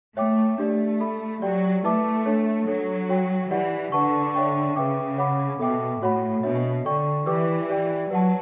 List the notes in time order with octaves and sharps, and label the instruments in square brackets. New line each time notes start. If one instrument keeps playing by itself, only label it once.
[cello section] A3 [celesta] C#5 E5 G5 D6
[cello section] A3 [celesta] D4 G4 D5
[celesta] A4 E5 B5
[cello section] F#3 [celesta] G4 D5 G5
[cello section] A3 [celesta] E4 B4 E5 A5 D6
[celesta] D4 A4 C#5
[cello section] F#3 [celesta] D4 A4 C#5
[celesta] F#4 C#5 G5
[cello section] E3 [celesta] G4 D5 F#5
[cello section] D3 [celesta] B4 F#5 A5 C#6
[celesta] C#5 E5 G5 C#6
[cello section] C#3 [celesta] B4 E5 G5 D6
[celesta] C#5 F#5 B5 D6
[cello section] B2 [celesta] A4 E5 G5 D6
[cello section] A2 [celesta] F#4 C#5 F#5 B5
[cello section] B2 [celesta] D4 F#4 C#5 E5
[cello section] D3 [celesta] A4 D5 G5 C#6
[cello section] E3 [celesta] G4 B4 D5 G5 D6
[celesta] G4 D5 G5
[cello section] F#3 [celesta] B4 F#5 A5